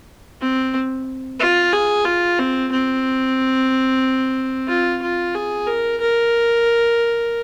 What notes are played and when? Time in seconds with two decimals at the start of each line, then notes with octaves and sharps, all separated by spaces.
0.41 C4
1.39 F4
1.73 G#4
2.05 F4
2.39 C4
2.71 C4
4.68 F4
5.02 F4
5.35 G#4
5.67 A#4
6.01 A#4